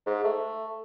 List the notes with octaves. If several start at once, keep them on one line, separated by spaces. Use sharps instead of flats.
G#2
A3